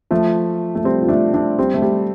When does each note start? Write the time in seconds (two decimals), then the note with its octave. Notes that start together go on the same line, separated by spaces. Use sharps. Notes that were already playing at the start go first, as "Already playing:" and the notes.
0.11 F3 A3
0.75 A3
0.84 G3 C4
1.02 F4
1.08 A3 D4
1.34 A3 D4
1.58 G3 C4
1.74 A3
1.82 G3